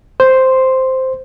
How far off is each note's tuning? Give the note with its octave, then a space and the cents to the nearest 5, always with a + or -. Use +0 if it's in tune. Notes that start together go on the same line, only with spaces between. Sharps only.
C5 +0 C6 +0